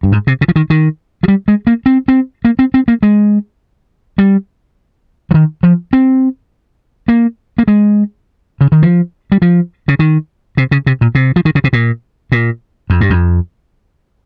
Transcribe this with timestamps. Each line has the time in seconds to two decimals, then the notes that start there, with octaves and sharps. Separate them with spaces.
0.03 G2
0.12 G#2
0.27 C3
0.41 C#3
0.48 F3
0.56 D#3
0.70 D#3
1.23 F3
1.28 G3
1.48 G#3
1.67 A#3
1.86 C4
2.08 C4
2.45 A#3
2.59 C4
2.74 C4
2.88 A#3
3.03 G#3
4.18 G3
5.31 F3
5.34 D#3
5.63 F3
5.93 C4
7.08 A#3
7.58 A#3
7.68 G#3
8.61 C#3
8.72 D#3
8.83 F3
9.32 G3
9.42 F3
9.88 C#3
9.99 D#3
10.57 C3
10.71 C#3
10.87 C3
11.01 A#2
11.15 C3
11.36 F3
11.45 D#3
11.55 C#3
11.64 C3
11.73 A#2
12.32 A#2
12.90 F2
13.01 G2
13.10 F2